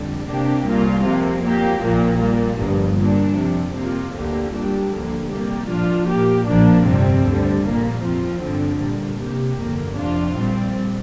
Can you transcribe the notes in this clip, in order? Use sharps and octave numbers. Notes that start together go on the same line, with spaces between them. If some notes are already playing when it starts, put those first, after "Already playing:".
Already playing: F2 D3 G3
C3 A#3 D4 G4
C2 A#2 A#3 F4
F2 C3 A#3
A#2 A#3 G4
A#1 A#2 F3 A#3
A#2 G3 A#3
G1 G2 F3
A#2 G3 D4
F2 C3 F3
C3 A#3 F4
D2 D3 A#3 G4
A#2 G3 D4 G4
D2 D3 F3 A#3
C3 G3 A#3 G4
A#2 F3 D4 F4
A#2 A#3 G4
A#1 A#2 F3 A#3 D4
G1 F2 C3 G3 C4
D2 D3 G3
A#1 A#2 A#3
F2 F3 C4 F4
G2 D3 F3 C4
A#2 G3 A#3
C3 A#3 G4
G1 F2 D3 A#3
F2 C3 F3 D4 F4
A#1 A#2 G3 C4